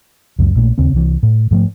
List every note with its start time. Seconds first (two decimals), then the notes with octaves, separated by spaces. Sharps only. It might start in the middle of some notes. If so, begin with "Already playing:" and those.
0.39 C#2 F#2 F#3
0.55 A#1 A#2 A3
0.78 D#2 C#3 C4
0.93 C2 E3
1.23 A2
1.51 G#2 F3 A3